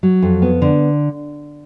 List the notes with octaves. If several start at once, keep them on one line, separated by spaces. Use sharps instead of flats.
F#3
F2
B3
D3